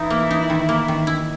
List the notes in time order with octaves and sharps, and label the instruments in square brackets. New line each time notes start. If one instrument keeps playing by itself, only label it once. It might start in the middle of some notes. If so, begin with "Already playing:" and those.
Already playing: [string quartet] E3 E4 [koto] D#4
[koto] A#3
D#4
D#3
A#3
D#3
E4